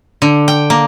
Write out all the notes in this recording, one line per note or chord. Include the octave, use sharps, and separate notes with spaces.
D3
G5
A#3